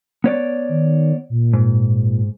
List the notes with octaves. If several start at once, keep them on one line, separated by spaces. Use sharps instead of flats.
B3 C#5 D5
D#3
A#2
G#2